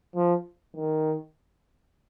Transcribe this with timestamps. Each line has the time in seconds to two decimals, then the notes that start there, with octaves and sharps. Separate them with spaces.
0.15 F3
0.76 D#3